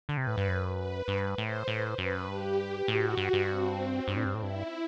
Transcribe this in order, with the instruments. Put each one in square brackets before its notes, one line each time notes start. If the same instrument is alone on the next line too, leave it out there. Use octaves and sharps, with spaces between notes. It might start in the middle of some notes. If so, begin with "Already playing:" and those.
[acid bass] D3
[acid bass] C3 [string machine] B4
[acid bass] A2
G2
F#2
[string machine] B4
[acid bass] G2
[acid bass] A2 [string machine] C5
[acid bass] A2 [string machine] B4
[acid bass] F#2 [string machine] B4
[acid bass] G2 [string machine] G4
[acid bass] A2 [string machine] F#4
[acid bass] G2
G2
[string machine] C4
[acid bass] G2 [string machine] D4
[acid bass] A2
G2
[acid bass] A2 [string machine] E4
[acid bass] G2